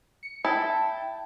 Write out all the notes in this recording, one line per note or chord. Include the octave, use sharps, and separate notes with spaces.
C#7
E4 G5 A5